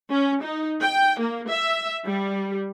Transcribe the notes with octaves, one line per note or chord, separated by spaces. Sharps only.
C#4
D#4
G5
A#3
E5
G3